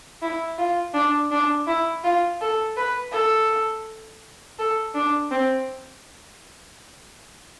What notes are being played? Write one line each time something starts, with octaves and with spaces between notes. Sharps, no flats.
E4
F4
D4
D4
E4
F4
A4
B4
A4
A4
D4
C4